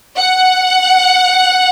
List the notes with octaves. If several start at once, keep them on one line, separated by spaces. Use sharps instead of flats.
F#5